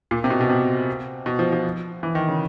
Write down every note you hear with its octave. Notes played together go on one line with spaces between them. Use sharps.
A#2
C3
B2
B2
C3
B2
F3
F3
E3
D#3
C#3